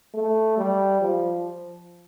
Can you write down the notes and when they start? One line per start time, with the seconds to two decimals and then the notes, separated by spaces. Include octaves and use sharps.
0.14 A3
0.57 G3
1.01 F3